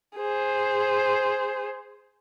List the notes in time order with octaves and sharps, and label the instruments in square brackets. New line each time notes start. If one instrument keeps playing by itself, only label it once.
[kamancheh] G#4 C5